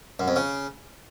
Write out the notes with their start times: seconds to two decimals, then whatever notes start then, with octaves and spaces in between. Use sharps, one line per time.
0.19 F#2
0.28 F2
0.36 C#3